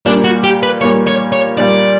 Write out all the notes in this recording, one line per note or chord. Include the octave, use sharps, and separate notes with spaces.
A#2 G3 A#3 D4
F#4
G4
B4
A#2 G3 A#3 C#5
C#5
C#5
A#2 G3 A#3 D5